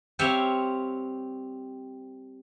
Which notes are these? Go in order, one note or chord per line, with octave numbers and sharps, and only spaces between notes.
G3 C4 C5 C#5 E5 F5